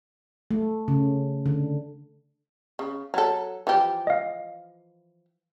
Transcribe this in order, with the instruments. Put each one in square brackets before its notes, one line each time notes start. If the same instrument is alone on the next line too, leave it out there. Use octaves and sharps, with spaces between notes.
[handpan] A3
C#3
D3
[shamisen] C#3
F#3 A4
E3 F3 G4
[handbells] D#5 F5